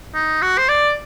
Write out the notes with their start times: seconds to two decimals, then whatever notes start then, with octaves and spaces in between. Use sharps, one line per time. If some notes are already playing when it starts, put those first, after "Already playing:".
0.15 D#4
0.42 F#4
0.58 C5
0.69 D5